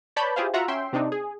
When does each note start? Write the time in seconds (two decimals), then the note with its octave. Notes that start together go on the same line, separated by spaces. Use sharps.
0.16 B4 C#5 D5 A5 B5 G6
0.36 E4 F4 G4 G#4 C5 F5
0.54 F4 F#4 E5 F#5 A#5
0.68 C#4 E5 G5 C6
0.93 C3 C4 D4 D#4
1.12 G#4